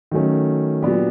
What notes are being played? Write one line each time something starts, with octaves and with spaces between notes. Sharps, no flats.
D#3 F#3 A3 C#4
A#2 F#3 B3 D4 G4